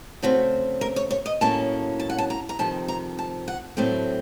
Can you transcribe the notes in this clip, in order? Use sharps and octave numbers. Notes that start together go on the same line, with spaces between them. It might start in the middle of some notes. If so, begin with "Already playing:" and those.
C#3 A3 C4 F#4
A#4
C#5
C#5
D#5
A2 F#3 A#3 C#4 A5
A5
F#5
A5
A#5
A#5
F2 C3 D#3 A5
A#5
A5
F#5
A2 F#3 A3 C4 A5